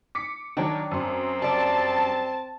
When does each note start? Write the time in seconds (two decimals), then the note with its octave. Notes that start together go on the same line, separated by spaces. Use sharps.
0.15 D6 B6 C#7
0.57 D#3 F#3 D4 G5
0.91 F#2 C4 C6
1.42 G3 D5 A5